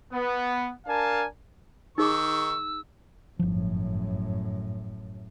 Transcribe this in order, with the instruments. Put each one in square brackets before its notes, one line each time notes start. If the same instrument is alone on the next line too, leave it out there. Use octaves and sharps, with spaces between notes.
[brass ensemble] B3
D4 A#4 F5 G#5 A5
[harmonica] D#3 C#6 [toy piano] D#4 G#4 D6 [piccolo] E6
[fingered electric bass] G1 F3 [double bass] F#2 A2